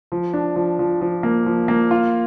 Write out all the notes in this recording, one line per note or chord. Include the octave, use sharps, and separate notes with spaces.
F3
D4
F3
F3
F3
A#3
F3
A#3
F4